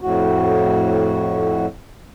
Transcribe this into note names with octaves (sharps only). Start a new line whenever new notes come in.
F2 A2 F#4